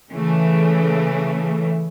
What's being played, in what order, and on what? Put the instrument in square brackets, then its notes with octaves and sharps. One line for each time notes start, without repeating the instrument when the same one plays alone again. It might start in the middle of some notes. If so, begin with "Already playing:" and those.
[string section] C#3 E3 A3